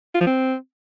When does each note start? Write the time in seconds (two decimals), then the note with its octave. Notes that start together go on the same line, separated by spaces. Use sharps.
0.15 F4
0.21 F3
0.27 C4